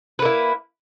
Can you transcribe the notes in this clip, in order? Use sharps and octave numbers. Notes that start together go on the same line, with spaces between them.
A#3 E4 B4